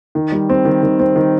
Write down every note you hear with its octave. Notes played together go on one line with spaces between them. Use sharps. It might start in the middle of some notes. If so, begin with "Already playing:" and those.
D#3
G3
C4
D#3
D#3
C4
D#3